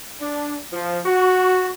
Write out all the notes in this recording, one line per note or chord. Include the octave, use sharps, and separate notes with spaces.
D4
F3
F#4